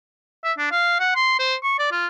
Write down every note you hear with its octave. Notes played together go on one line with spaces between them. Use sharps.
E5
D4
F5
F#5
C6
C5
C#6
D5
F4